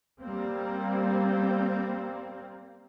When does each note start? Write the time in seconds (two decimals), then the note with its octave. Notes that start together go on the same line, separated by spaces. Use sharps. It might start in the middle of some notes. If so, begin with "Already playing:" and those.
0.20 G3 A#3 C4